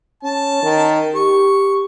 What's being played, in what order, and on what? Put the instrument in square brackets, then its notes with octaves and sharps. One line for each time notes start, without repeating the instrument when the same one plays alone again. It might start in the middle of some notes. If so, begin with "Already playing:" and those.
[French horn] C#4 [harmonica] A5
[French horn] D#3
[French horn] G4 [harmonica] C#6